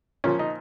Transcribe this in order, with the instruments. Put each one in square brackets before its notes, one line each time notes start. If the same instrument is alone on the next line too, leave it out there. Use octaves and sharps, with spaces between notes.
[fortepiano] A#2 F3 C#4
D#4